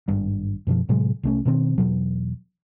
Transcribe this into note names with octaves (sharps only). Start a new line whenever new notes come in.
G#1 G2
F#2 B2 F3
A2 C3 F#3 G#3
C2 A3 C#4
B2 D#3 C4
E1 B2 F#3